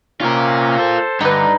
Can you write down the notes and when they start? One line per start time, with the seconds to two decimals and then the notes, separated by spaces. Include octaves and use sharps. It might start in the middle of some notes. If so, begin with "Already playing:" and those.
0.21 C3 A#3 C#4 F4 A#4
0.78 A4 C5
1.21 G2 D3 D#4 B4